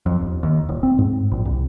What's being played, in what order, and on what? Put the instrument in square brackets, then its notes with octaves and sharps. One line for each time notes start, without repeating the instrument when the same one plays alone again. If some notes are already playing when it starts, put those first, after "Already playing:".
[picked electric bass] F2
E1
D#2
D#1
C4
G#2
A#1
C2